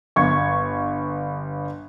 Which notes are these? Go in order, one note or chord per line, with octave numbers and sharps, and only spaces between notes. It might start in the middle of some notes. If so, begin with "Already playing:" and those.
G1 C#6 G#6